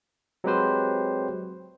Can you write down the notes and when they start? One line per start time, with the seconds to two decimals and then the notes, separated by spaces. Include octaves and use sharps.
0.44 F#3 G#3 C4 G4 B4 C5